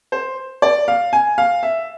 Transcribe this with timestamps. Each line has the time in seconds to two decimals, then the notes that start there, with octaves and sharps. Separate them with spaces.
0.12 C5
0.62 D5
0.88 F5
1.13 G#5
1.38 F5
1.63 E5